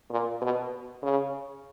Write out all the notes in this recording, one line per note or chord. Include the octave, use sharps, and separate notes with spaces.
A#2
B2
C#3